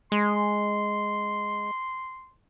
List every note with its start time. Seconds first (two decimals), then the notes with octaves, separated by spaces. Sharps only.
0.12 G#3 C6